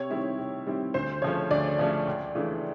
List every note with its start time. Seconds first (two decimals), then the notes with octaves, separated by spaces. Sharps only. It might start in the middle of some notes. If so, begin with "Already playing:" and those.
Already playing: C3 C#5
0.10 D#3 G3 C4 E4
0.38 C3
0.66 D#3 G3 C4 E4
0.94 D2 C5
1.22 C#3 F3 A3 C#4 C#5
1.51 D2 D5
1.78 C#3 F3 A3 C#4
2.07 C#2
2.35 C#3 E3 A3 D4